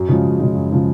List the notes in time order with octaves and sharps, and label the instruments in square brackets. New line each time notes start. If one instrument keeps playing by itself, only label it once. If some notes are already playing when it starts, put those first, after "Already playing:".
Already playing: [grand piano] F#2
C#3 F3 G#3
F#2
C#3 F3 G#3
F#2
C#3 F3 G#3